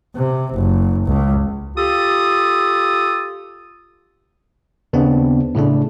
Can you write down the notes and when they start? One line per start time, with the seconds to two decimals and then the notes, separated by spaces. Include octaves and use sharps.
0.16 C3
0.53 F#1
1.06 C#2
1.76 F4 G4 A4 D#6
4.93 D#2 C#3 B3 C4 D4
5.55 A2 C#3 A3 D4